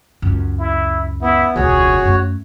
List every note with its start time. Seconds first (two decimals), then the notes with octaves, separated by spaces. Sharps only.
0.22 C#2 F#2
0.59 E4
1.22 B3 E4
1.56 E1 C#2 F#4 G#4 C#5
2.03 F#2 A3